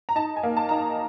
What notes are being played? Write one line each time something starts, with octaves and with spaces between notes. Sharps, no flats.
A#5
D#4 A5
G#5
A#3
A5
D#4 A#5
A5